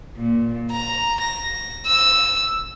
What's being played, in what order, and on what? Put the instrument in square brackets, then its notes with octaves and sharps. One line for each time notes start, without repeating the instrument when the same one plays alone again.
[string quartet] A#2
A#5
A#6
E6